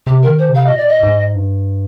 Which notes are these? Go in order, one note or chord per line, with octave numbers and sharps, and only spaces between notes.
C3 G4
A#4
D#3
C5
C3
F5
A#2 D#5
D5
D#5
G#2
G2